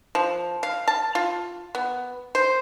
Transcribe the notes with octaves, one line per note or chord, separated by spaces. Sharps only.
F3
F5
A5
F4
B3
C5